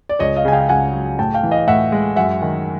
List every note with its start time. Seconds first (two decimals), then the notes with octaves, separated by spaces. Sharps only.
0.09 D5
0.19 C#2 C#5 D#5
0.36 D#5 F5
0.45 C#3 G#5
0.52 F5 G5
0.69 C#2 F#5 G#5
0.93 F#3
1.19 A2 G5 A5
1.34 F5 G5
1.43 E3
1.51 D#5 F5
1.67 A2 E5 F#5
1.92 G#3
2.16 F#2 E5 F#5
2.42 D#3